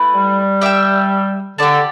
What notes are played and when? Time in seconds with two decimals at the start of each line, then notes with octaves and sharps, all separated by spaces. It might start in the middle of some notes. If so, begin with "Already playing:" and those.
Already playing: A3 E4 B4
0.13 G3
0.61 G4 E5 G5
1.58 D3 G4 D5 A5